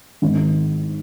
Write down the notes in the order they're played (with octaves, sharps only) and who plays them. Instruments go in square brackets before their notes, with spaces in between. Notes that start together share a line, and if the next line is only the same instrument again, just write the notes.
[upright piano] G#1 G#2 D#3